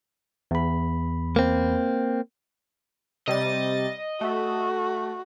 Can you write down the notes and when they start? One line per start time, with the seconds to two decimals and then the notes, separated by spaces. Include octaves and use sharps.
0.51 E2 B5
1.36 A#3 C4
3.28 C3 G3 D#5 A6
4.21 A3 F#4